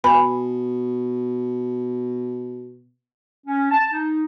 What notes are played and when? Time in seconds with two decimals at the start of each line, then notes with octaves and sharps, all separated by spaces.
0.04 B2 B4 G#5 B5
3.47 C#4
3.71 A5
3.92 D#4